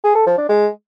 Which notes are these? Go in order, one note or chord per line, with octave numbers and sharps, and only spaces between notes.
G#4
A4
F3
D4
G#3